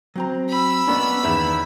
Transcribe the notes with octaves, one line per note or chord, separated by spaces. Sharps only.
F#3 C4 A#5
B5 E6
G#3 A#3 B3 C#4 D4
E2 D#3 E5